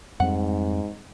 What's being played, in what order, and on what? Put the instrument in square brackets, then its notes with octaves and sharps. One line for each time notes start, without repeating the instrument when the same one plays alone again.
[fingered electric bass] F2 G3 C4 [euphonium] G#2 [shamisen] F#5